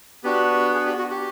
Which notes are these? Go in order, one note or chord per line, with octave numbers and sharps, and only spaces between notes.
B3 D4 F#4 G4
G#4
G4
F#4
G4